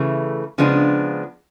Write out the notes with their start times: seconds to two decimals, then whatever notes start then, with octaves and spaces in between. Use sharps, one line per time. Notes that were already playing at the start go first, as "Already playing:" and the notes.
Already playing: C#3 E3 A3
0.58 C#3 F3 G#3 B3 D4